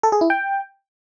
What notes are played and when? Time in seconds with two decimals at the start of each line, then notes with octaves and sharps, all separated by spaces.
0.03 A4
0.12 G#4
0.21 E4
0.30 G5